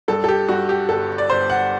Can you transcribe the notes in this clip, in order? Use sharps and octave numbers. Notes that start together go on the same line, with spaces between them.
G2 A4
A4
G4
G2 F#4
G4
G1 A4
D5
G1 C5
F#5